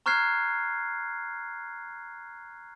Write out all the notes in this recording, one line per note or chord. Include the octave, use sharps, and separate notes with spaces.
A#5 C#6 F6 F#6 G#6 C7